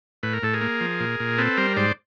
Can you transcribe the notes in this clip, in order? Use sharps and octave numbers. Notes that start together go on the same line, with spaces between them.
A2 B4
A#4
A2 A4
G#4 A#4
A#3
F3
A#2
A#2
C4 A4 B4
G3 A#4 C5
G#2 C5 D5